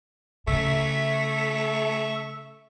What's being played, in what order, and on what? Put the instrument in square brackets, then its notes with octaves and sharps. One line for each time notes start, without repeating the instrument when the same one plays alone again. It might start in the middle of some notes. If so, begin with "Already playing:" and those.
[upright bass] C#3 [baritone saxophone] A3 [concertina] E5 C#6